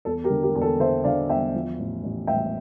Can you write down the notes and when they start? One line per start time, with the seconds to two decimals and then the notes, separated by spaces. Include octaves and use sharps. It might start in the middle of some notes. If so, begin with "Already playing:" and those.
0.05 E2 A4
0.24 G4 A#4
0.30 D3
0.43 G4 A#4
0.55 E2
0.62 A4
0.79 D3 C5 E5
1.04 D3 D5 F5
1.29 E2 E5 G5
1.54 F3
1.79 A1
2.03 A1
2.27 A1 E5 G5